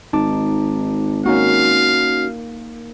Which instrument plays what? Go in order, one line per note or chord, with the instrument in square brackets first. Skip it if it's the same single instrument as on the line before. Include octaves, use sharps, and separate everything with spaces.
[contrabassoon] G#1 [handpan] D#4 [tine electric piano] A5 D6
[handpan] A#3 [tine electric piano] C#4 D#4 F#4 [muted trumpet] F5